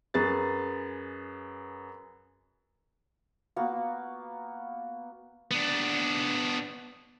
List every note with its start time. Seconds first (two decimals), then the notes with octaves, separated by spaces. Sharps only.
0.14 F#2 G#4 B4 A6
3.56 A#3 B3 F#4
5.51 B3 D4